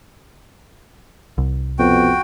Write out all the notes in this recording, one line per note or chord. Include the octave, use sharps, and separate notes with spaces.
C2
F2 B2 F#4 G5